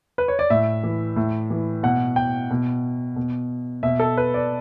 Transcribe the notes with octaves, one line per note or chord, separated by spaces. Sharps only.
B4
C#5
D5
A2 E5
E3
A2
E3
B2 F#5
G5
B2
B2
B2 E5
A4
B4
D5